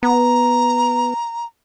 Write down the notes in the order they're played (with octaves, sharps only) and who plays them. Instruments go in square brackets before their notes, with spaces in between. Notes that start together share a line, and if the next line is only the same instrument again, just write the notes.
[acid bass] B3 [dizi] A#5